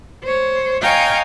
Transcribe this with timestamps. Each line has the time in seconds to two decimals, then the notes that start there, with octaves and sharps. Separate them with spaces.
0.24 C5 C#5
0.82 C#5 D#5 F5 G5 G#5 A#5